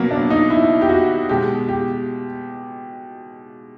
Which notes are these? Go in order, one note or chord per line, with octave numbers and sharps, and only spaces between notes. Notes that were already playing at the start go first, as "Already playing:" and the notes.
Already playing: B2 F#3 A#3 B3
D4
D#4
E4
G4
F#4
B2 G#3 G4
G4